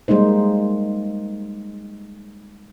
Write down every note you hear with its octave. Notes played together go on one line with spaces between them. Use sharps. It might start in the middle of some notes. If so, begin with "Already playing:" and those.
G3 G#3 A#3 D#4 C5